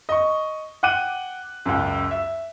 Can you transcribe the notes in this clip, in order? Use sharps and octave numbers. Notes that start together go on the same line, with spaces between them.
D#5 C#6
F#5 G5 D6 F#6 D#7
C#2 F#2
E5